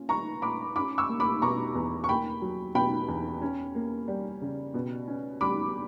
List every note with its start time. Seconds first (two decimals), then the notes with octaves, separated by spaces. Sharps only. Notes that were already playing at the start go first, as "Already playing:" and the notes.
Already playing: A#2 C#4
0.09 G3 A#5 C#6
0.42 A#2 B5 D6
0.76 C#4 B5 D6
0.98 C#6 E6
1.09 A#3
1.20 B5 D6
1.42 B2 A#5 C#6
1.75 E2
2.04 C#6
2.09 A#3 G5 B5
2.42 F#3
2.75 B2 G5 B5
3.08 E2
3.42 C#4
3.75 A#3
4.08 G3
4.41 C#3
4.74 B2
5.07 C#4
5.41 G3 B5 D6